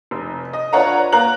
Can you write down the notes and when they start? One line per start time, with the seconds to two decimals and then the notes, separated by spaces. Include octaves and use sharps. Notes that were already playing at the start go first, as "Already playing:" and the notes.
0.11 F1
0.53 D#5
0.73 D4 F4 B4 C#5 F#5 A#5
1.12 A#3 A#5 F#6 F#7